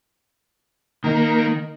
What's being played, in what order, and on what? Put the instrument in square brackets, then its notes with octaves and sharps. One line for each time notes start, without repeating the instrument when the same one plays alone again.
[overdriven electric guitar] D#3 D#4 [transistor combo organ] A#3